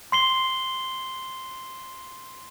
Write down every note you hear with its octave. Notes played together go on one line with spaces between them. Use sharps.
C6 C7 G7